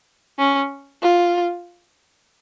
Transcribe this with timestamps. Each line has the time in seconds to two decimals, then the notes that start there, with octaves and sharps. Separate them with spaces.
0.39 C#4
1.02 F4